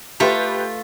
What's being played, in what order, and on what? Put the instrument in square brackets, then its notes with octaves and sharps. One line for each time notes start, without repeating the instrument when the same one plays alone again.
[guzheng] A3 F4 [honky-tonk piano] G4 B4